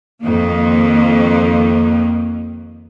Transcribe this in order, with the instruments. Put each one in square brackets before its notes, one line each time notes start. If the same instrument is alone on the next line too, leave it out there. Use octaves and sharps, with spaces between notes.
[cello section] F2 D#3 A#3